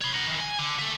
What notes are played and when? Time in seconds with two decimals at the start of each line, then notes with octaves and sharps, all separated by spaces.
0.02 C#5 B5
0.14 A#4 F#5
0.28 D#3 E3
0.40 G#5
0.58 D3
0.79 A4 E5